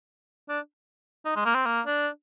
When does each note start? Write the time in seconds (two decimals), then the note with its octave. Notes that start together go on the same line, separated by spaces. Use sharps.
0.49 D4
1.25 D#4
1.36 G#3
1.45 A#3
1.55 C4
1.66 A#3
1.87 D4